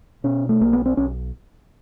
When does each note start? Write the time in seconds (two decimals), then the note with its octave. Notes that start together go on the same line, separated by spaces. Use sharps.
0.24 B2 C#4
0.49 A3
0.61 B1 A#3
0.73 B3
0.86 C4
0.97 B1 C#4